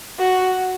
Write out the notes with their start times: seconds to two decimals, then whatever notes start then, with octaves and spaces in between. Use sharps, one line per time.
0.19 F#4